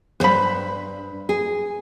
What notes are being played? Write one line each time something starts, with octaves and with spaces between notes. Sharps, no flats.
E2 G2 B4 C5 B5
G#4